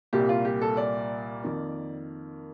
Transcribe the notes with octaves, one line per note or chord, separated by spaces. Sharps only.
C2 A#2 G3 A#3 G4
F4
G4
A4
D5
F2 D#3 A#3